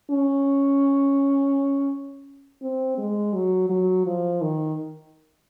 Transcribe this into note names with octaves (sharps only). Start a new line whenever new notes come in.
C#4
C4
G#3
F#3
F#3
F3
D#3